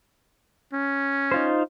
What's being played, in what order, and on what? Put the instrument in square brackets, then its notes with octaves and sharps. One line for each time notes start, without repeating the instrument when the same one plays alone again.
[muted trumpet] C#4
[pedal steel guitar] D#4 F4 C5